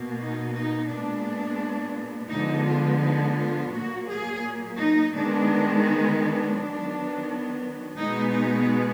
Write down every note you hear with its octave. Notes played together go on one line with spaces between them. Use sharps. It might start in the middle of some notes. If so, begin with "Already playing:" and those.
Already playing: B2 A#3
D#4
D#4
A#2 G#3 B3 D4
D3 F3 G#3 B3 D#4
F4
D#4
F4
A#2 F#3 A#3 F#4
G#4
D#4
D#3 G#3 B3 D4
D#4
D4
D#3 F#3 B3
B2 G#3 B3 D#4
D#4